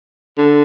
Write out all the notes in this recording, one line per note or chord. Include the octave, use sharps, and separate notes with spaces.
D3